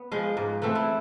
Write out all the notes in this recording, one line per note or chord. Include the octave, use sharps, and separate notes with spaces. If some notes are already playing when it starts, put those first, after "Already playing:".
Already playing: B3
F3 G#3
G#2
E3 A3 C4
E4